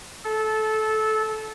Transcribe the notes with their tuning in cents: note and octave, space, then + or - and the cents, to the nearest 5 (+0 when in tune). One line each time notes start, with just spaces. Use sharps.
A4 -20